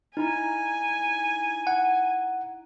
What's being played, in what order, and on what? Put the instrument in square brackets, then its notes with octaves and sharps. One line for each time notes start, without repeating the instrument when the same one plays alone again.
[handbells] D#4 E4 A#5 [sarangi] G#5
[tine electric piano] F#5